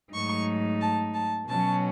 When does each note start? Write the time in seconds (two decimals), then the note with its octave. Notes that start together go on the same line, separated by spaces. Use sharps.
0.13 G#2 F#3 A3 D#4 C#6
0.81 A5
1.14 A5
1.48 B2 F#3 C#4 A5